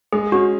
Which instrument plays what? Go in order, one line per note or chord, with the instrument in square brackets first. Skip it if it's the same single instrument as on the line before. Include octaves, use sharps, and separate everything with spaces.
[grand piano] G#3 [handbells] G#4
[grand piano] C#4 [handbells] F#4